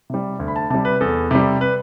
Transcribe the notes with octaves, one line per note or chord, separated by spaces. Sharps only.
C3 G3
D2
B5
A5
C3 G3 A5
B4
E2 A4
C3 G3
B4